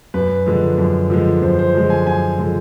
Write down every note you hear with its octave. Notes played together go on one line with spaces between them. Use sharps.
F#2 B4
D3 F3 G#3
F#2
D3 F3 G#3
F#2 C5
C5
D3 F3 G#3
G#5
F#2 G#5
D3 F3 G#3